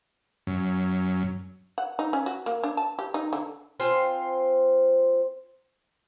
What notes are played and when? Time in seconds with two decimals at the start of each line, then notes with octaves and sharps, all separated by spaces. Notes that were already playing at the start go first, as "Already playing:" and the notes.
0.47 F#2
1.78 F#5
1.99 D#4
2.13 C#4
2.26 F#4
2.46 A#3
2.63 D4
2.77 A5
2.99 G4
3.14 D#4
3.33 D3
3.80 C4 F4 C5 G#5